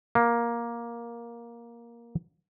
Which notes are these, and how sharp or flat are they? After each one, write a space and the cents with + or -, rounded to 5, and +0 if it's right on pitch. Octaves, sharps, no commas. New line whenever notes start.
A#3 +10